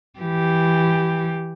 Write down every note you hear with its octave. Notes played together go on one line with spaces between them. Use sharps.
E3 G4